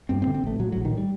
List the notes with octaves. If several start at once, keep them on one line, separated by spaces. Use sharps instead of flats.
G2 C4
C4
D3
C4
A1 A3
A2 F#3
A#1 F#3
D#3
G3